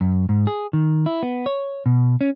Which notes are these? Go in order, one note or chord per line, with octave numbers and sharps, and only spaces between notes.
F#2
G#2
G#4
D#3
E4
B3
C#5
B2
C#4